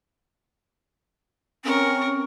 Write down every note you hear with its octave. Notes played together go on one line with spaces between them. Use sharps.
C4 C#4 A#4 C#6